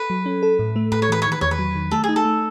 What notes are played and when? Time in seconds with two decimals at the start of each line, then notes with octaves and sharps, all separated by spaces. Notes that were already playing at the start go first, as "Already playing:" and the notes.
Already playing: A4 B4
0.10 F#3
0.26 C#4
0.43 A4
0.59 A2
0.76 A3
0.92 A2 B4
1.02 C#5
1.09 E3 B4
1.22 D#3 C#5
1.32 B4
1.41 E2 C#5
1.51 B4
1.59 F#3
1.75 D#3
1.91 A3 A4
2.04 G#4
2.09 D#4
2.16 A4
2.25 A3